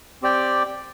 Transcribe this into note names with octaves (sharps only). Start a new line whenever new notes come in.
C4 G4 D5 G5